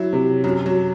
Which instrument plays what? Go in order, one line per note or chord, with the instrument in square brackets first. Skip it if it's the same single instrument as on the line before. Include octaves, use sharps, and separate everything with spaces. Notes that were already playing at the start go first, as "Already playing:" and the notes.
Already playing: [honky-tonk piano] F#3 [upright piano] E4
[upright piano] C3
[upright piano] F#2 [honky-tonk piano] F#3
[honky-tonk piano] F#3